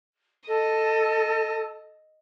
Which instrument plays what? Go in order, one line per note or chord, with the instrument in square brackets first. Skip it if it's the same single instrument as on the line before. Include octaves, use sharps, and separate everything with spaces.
[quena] A4 [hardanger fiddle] D#5